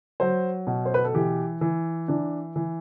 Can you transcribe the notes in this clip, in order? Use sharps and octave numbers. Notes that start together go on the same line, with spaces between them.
F#3 C5
B2
C5
B4
A4
E3 G4
E3
E3 D4
E3